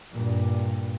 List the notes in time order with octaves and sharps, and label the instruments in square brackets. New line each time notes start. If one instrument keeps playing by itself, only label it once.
[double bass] G2 A#2